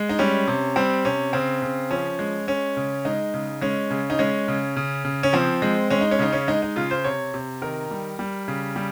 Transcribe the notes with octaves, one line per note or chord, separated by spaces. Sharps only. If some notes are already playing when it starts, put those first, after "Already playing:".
Already playing: G#3
D#4
G3 C#4
C3
G3 C4
C3 C#4
C#3 C4
C#3
F3 C#4
G#3
G#3 C#4
C#3
G#3 D#4
C#3
G#3 C#4
C#3
D#4
G#3 C#4
C#3
C#3
C#3
C#4
F3 C4
G#3
G#3 C#4
D#4
C#4
C#3 D#4
C#4
G#3 D#4
D#4
C#3 F4
C5
C3 C#5
C3
D#3 A#4
G3
G3
C#3
G3